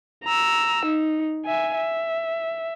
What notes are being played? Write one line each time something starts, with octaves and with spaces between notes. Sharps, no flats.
A#5 E6
D#4
E5 G#5
E5